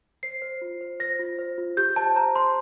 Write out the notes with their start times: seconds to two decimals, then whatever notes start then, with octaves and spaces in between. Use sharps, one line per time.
0.23 C5 C7
0.42 C5
0.62 F4
0.81 C5
1.00 C5 A#6
1.19 F4
1.39 C5
1.58 F4
1.77 G4 G6
1.96 C5 A5
2.16 C5 A#5
2.36 C5 C6